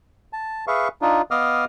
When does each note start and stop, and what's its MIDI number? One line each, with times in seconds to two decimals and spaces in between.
0.33 0.65 81
0.68 0.88 68
0.68 0.88 71
0.68 0.88 76
0.68 0.88 77
0.68 0.88 85
1.02 1.22 62
1.02 1.22 63
1.02 1.22 65
1.31 1.65 59
1.31 1.65 75
1.31 1.65 77
1.31 1.65 86
1.31 1.65 87
1.31 1.65 89